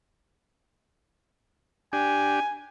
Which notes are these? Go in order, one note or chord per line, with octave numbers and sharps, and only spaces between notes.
D4 G4 G#5